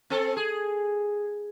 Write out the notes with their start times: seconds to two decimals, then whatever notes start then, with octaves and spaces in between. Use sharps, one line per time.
0.10 C4 A4
0.37 G#4